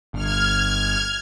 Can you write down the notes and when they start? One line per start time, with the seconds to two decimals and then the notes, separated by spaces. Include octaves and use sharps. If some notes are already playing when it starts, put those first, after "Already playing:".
0.14 G1 F6 G#6